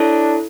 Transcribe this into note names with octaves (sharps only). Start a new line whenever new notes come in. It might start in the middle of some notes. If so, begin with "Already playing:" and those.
Already playing: D4 E4 A4 C#5